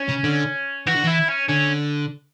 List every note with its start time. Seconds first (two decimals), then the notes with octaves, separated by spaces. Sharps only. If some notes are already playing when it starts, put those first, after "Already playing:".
Already playing: C#4
0.09 C#3
0.24 D3
0.87 E3 F#4
0.95 D3
1.04 E3 E4
1.28 C#4
1.49 D3 C#4